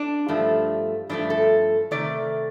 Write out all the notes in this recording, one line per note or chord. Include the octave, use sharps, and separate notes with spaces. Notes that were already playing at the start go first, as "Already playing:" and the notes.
Already playing: D4
G2 F3 A3
G2 F3 A3 D4
A4
C3 D#3 A3 D5